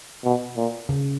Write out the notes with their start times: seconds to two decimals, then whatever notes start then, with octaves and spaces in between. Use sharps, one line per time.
0.24 B2
0.56 A#2
0.89 C#3